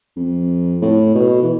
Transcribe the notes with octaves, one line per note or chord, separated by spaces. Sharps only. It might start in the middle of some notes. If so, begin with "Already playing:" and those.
F2
A2
B2
E3